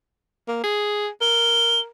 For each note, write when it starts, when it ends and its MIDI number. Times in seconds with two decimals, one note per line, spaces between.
0.48 0.61 58
0.64 1.08 68
1.21 1.88 70
1.21 1.80 103